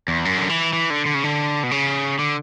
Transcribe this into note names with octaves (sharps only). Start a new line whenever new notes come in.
E2
F#2
D3
E3
E3
D3
D3
C#3
D3
B2
C#3
D3